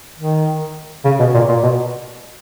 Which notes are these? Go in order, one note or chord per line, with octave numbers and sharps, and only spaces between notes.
D#3
C#3
B2
A#2
A#2
B2